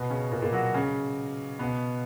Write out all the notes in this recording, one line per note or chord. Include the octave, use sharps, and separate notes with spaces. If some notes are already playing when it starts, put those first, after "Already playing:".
Already playing: B2 B3
C#3 C#4
A#2 A#3
A#2 A#3
F#3 F#4
C#3 C#4
B2 B3